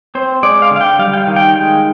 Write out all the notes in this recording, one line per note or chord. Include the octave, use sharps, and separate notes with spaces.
C4 C5
G#3 D5
F5
D3
F5
G5
G3 F5
G5
F5
D#3
G5
G#3 G5